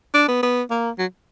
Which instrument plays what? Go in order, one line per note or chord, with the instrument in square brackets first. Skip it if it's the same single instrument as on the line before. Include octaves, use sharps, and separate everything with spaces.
[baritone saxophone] D4
B3
B3
A#3
F#3